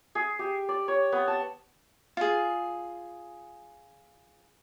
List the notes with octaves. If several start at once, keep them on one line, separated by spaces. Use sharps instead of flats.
G#4
G4
D5
C#5
B3
A5
F4 G#4